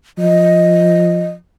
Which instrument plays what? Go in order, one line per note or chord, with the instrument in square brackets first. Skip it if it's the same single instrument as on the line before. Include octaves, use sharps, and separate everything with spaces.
[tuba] F3 [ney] D#5